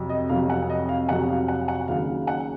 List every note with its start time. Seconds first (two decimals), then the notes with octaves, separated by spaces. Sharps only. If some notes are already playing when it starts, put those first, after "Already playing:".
Already playing: F2 C3 F#3
0.09 D#5
0.29 F2 C3 F#3 F5
0.49 F#5
0.70 D#5
0.89 F5
1.09 F2 C3 F#3 F#5
1.29 F5
1.48 F#5
1.68 F#5
1.88 D#2 C#3 F#3 F5
2.27 F#5